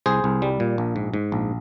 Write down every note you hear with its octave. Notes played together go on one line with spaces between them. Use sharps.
C2 G#4 C5
C2
G3
A#2
A#1
G#2
G#2
A#1